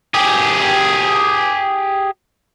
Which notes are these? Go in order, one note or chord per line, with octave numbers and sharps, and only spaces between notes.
G4 G#4